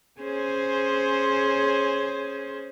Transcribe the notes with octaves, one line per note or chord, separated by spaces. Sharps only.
C#4 G#4 C5